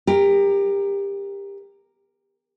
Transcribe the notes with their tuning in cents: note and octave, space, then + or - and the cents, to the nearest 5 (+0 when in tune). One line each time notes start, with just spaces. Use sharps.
G4 +25 A#4 +0